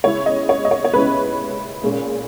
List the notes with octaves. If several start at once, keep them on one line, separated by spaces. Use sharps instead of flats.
C#3 G#3 C#4 E4 C#5
D#5
C#5
D#5
C#5
C#5
C#3 G#3 C#4 E4 B4
A#2 G#3 C#4